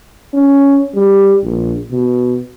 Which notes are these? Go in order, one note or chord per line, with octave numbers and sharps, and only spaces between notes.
C#4
G3
A#1
B2